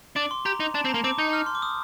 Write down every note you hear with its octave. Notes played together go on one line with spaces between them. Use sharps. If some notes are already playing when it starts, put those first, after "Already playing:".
D4 D6
C6
G4 A#5
D#4
D4 A5
C4
A#5
A#3
C4 D6
D#4 G6
F6
C6
D6
D#6